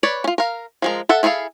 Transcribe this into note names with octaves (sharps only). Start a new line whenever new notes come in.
B4 C#5 D5
C#4 F4
A#4 F5
F3 G#3 A#4
A4 E5 F#5
E4 G#4 A4 B4 F5